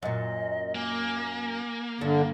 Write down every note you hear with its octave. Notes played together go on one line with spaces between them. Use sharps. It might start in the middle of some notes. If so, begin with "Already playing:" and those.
F#2 A#2 D#5
A#3 G#5
G2 D3